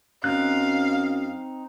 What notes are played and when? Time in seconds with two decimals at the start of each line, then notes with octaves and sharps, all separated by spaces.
0.24 F#2 C4 D#4 F5 F#6